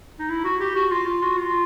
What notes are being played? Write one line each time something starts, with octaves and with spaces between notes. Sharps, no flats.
D#4
E4
F#4
G4
F#4
F4
F4
F#4
F4